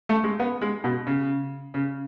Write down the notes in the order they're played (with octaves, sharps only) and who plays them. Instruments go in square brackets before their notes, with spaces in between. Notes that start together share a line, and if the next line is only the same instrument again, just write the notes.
[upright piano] A3
G#3
B3
G#3
B2
C#3
C#3